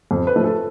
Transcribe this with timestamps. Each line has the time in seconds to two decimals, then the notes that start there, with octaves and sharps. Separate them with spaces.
0.11 F2
0.27 B4
0.36 F3 A3
0.44 A4